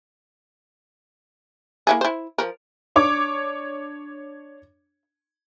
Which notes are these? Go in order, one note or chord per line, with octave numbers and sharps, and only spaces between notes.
A#3 E4 G#4
E4 C5
F3 A#4
D4 C#5 D6